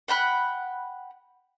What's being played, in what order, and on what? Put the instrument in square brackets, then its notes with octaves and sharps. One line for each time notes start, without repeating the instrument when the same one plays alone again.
[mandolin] F#5 G5 B5 F#6